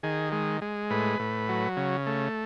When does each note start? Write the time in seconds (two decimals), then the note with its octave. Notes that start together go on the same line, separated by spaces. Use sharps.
0.03 D#3 G#4
0.32 G#3
0.61 G#3
0.90 A2 B4
1.19 A2
1.49 F#3
1.77 C#3
2.06 A3